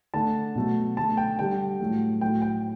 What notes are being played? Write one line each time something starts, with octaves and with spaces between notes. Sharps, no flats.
D3 A3 A5
B2 F#3 A3
D3 A3 A5
G5
D3 G3 G5
A2 F#3 A3
A2 F#3 A3 G5
G5